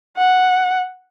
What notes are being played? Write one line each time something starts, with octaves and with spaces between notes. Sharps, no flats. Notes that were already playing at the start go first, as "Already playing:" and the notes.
F#5